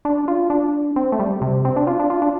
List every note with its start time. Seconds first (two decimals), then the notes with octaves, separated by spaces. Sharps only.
0.05 D4
0.28 F4
0.50 D4
0.96 C4
1.12 A3
1.19 G3
1.42 C3
1.65 C4
1.76 D4
1.87 F4
1.99 D4
2.10 F4
2.22 D4